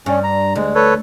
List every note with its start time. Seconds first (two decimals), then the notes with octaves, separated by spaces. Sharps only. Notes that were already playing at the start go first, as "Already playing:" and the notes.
0.06 G2 C#4
0.24 A#5
0.56 D2 G#3
0.75 A4 B4 C#5